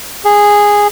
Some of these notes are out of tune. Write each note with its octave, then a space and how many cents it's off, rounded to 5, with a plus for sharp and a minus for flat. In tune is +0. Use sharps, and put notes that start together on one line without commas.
G#4 -10